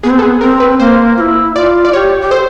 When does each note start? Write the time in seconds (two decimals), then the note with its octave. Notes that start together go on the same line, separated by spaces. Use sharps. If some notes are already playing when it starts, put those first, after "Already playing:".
0.03 B3 G#4
0.10 C4
0.18 B3 A4
0.22 G#4
0.41 C4 A#4
0.60 B4
0.79 A#3 C5
1.17 F4
1.21 E4
1.56 F4 D5
1.85 D5
1.93 G4 C#5
2.21 G4
2.31 A4 C5